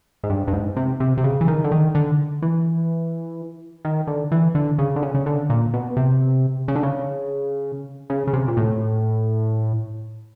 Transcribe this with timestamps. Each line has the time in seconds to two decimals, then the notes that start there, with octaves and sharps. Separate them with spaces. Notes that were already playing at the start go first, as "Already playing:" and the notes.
0.23 G#2
0.30 G2
0.48 G2
0.53 G#2
0.76 C3
1.00 C3
1.17 C3
1.24 C#3
1.41 E3
1.48 D#3
1.64 D3
1.71 D#3
1.95 D3
2.42 E3
3.85 D#3
4.07 D3
4.32 E3
4.55 D3
4.78 C#3
4.96 D3
5.03 C#3
5.14 C#3
5.26 D3
5.50 A#2
5.74 B2
5.97 C3
6.68 C#3
6.76 D3
6.83 C#3
8.10 C#3
8.27 C#3
8.33 C3
8.48 A#2
8.57 A2